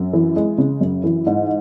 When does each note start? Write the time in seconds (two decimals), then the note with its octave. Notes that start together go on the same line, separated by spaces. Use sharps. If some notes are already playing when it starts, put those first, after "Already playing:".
Already playing: F#2
0.13 E3
0.36 G#3
0.58 C#3
0.81 F#2
1.04 E3
1.26 G#2